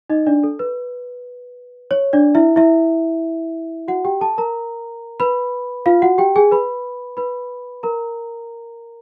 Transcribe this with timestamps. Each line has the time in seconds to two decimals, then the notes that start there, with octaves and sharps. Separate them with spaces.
0.10 D#4 D#5
0.26 D4 D5
0.43 A4
0.59 B4
1.91 C#5
2.13 D4 D5
2.35 E4 E5
2.56 E4 E5
3.88 F#4 F#5
4.05 G4 G5
4.21 A4 A5
4.38 A#4 A#5
5.20 B4 B5
5.86 F4 F5
6.02 F#4 F#5
6.18 G4 G5
6.36 G#4 G#5
6.52 B4 B5
7.17 B4 B5
7.83 A#4 A#5